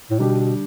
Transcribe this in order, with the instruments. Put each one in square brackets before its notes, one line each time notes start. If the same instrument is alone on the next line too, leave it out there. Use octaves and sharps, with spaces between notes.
[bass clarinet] A2
[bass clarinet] B2 [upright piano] D3 G3 D4 G4